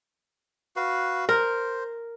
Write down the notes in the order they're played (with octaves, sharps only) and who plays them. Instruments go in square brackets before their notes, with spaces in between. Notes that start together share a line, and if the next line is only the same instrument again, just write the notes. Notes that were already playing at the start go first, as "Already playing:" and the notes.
[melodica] F#4 B4 F5
[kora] A#4 [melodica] C5